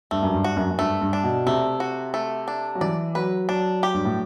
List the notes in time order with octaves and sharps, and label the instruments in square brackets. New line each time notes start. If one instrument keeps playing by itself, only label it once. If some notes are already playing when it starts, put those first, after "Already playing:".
[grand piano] G2 [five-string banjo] A3
[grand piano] F#2
G2
[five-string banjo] F#4
[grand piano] F#2
F#2
[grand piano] G2 [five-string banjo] A3
[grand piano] G2
[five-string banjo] D4
[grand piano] B2
[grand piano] C3 [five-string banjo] A3
[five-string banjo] F#4
A3
D4
[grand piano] F#3
[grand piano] E3 [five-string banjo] D5
[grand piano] F#3 [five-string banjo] B4
[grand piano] F#3 [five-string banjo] D4
[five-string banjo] G4
[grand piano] G2
A2